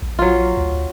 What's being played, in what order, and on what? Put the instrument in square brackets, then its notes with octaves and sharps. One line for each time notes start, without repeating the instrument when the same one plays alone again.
[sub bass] A#1
[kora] F#3 F4
[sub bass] D2